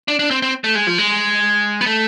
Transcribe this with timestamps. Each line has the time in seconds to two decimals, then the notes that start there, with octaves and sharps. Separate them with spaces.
0.08 D4
0.19 D4
0.31 C4
0.42 C4
0.64 A3
0.75 G#3
0.87 F3
0.98 G#3
1.81 B3
1.86 A3